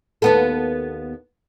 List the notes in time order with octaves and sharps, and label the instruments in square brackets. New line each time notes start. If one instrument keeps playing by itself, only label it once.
[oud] D#2 B3 A4